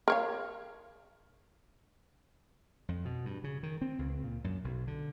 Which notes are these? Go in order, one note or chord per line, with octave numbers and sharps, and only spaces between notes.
A#4 C#5 F5
F2
B2
G2
C#3
D#3
C4
C#2
A#2
F#2
B1
D3